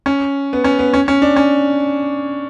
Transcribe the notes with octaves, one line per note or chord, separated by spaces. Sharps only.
C#4
B3
C#4
B3
C#4
C#4
D4
C#4